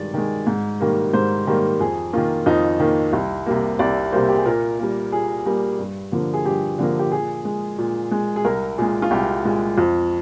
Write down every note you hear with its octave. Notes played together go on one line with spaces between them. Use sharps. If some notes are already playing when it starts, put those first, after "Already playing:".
Already playing: G2 D#3 G#3 D5
D#3 G#3
G#2
D#3 G3 A#3
G#2 C5
D#3 G3 A#3
F2 G#4
D#3 A#3 F4
F2 D#4
D#3 A#3
C2
C3 G3 A#3
C2 D5
C3 G3 A#3 C5
G4
G#4
A#2 A#4
G3 A#3
A#2 G#4
G3 A#3
G2
D3 F3 A#3
G#4
G2 G4
D3 F3 A#3
G4
A#2 G#4
G#3
A#2
G#3
G#4
C2 A#4
A#2 G#3 G#4
F4
C2 G4
A#2 G#3
F2